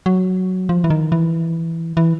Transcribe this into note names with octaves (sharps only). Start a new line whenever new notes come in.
F#3
F3
E3
D#3
E3
E3